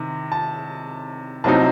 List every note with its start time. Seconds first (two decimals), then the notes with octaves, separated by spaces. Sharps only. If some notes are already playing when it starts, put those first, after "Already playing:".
Already playing: C3 D#3
0.32 A5
1.44 C2 C3 F#3 C4 D#4 A5